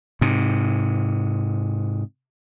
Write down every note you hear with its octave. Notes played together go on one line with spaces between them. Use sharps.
G#2 C3